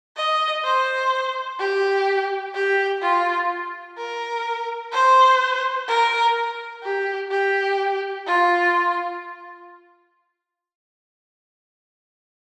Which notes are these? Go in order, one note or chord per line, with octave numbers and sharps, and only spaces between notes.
D#5
C5
G4
G4
F4
A#4
C5
A#4
G4
G4
F4